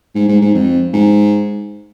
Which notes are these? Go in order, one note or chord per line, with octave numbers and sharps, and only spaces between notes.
G#2
G#2
G#2
F2
G#2